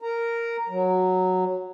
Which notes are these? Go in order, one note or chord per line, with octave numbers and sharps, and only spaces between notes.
A#4 A#5
F#3